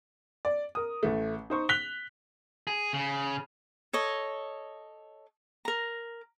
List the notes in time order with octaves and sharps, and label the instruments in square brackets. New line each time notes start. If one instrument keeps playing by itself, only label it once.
[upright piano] D5
A#4 D#6
A1 A3
D#4 C5 C#6
F#6 B6 F7 G7
[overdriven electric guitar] G#4
C#3
[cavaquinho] A4 C#5 D#5
A#4 A#5